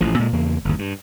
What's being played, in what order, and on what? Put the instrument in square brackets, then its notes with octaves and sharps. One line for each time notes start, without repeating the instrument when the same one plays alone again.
[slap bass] A1 A2 F3
A#2 G#3
E2 C#3 A#3
G1 D#2
G2